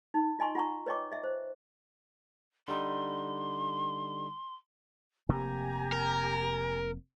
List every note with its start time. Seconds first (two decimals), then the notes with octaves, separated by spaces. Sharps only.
0.14 D#4
0.39 F4 D#5 G#5 C6 C#6
0.55 F4 F#5 A#5 C#6
0.86 B4 C#5 D#5 G5 C#6 D6
1.12 D#5 E5
1.24 C5
2.68 D3 G3 D#4 C6
5.29 F1 C3 A#3 G4 G#5 A#5
5.92 A#4